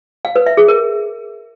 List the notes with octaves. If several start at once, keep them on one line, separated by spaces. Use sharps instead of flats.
F5
B4
E5
G#4
A#4